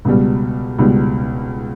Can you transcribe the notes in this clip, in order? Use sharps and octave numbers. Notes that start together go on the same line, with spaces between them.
C#2 B2 G3
C#2 B2 G3